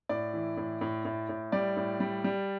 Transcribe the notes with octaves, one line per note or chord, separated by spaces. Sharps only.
A2 D5
E3
A2
A2
A2
A2
G3 D5
A2
G3
G3